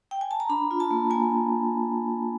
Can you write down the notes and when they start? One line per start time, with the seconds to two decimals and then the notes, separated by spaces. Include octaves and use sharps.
0.11 G5
0.21 G#5
0.31 A5
0.40 A#5
0.49 D4 B5
0.71 F4
0.80 A5
0.91 A#3
1.10 A#3 G#5